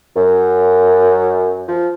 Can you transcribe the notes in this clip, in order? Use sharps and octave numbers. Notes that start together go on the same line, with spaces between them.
F#2
F3